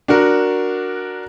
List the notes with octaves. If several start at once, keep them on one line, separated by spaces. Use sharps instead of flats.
D4 F#4 A#4